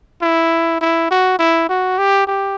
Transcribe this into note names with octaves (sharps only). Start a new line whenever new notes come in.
E4
E4
F#4
E4
F#4
G4
G4